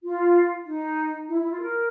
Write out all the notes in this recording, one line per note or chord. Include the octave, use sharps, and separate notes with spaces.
F4
D#4
E4
E4
F4
A#4